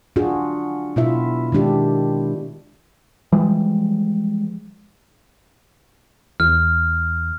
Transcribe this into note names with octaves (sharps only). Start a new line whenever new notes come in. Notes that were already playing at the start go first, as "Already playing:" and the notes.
D4 F4 F#4 G#4
B2 E4 F4 E5
D#3 G#3 D4 G4
E3 F3 G3 G#3
E2 F6